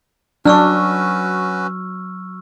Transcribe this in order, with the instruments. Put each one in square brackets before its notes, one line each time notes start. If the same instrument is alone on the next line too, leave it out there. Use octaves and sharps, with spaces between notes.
[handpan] F#3 [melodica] C#4 F#4 B4 [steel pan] D4 [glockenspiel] C#6 E6 F6